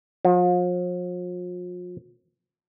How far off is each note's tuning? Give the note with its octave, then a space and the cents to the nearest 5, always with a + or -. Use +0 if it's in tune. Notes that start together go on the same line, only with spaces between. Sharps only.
F3 +40